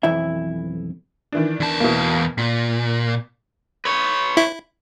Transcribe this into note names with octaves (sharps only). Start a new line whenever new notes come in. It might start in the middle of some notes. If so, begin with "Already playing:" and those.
B1 F2 E3 E4 E5
D#3 E3 D4
E2 A5
B2 E3 A#3
A#2 B6
B4 C#5
E4 E5